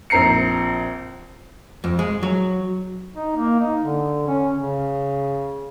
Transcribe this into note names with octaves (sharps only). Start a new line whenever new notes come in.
A#1 C4 A#5 C7 C#7
F2
G#3
F#3
D#4
A#3
D#4
D3
C#4
C#3